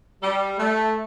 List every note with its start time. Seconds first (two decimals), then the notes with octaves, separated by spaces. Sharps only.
0.22 G3
0.58 A3